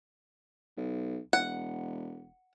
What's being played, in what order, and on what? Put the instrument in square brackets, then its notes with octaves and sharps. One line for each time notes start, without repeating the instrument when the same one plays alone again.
[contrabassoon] B1
[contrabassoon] E1 [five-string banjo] F#5